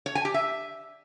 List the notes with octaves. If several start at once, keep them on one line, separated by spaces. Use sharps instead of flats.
C#5
G#5
G4
E5